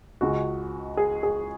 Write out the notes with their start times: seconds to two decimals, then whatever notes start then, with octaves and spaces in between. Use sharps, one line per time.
0.21 C#2 C#3 G#3 F#4
0.97 G#4
1.23 G#4